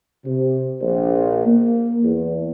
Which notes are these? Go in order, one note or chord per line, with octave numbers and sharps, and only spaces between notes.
C3
A#1
A#3
E2